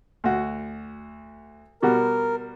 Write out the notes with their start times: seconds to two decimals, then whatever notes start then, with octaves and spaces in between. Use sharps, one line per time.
0.24 D2 F#4
1.82 B2 G3 F#4 A#4